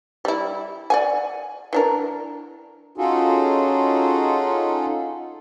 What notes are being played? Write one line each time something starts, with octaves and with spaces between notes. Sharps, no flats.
G3 E4
D5 F#5 G#5
E3 D4 A#4
C#4 D#4 F4 F#4 G#4 A4